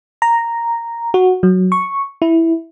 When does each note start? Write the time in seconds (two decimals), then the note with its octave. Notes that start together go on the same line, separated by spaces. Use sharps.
0.22 A#5
1.14 F#4
1.43 F#3
1.72 C#6
2.22 E4